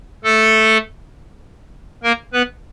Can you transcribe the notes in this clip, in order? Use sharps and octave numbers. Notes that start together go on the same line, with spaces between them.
A3 A4
A#3 A#4
B3 B4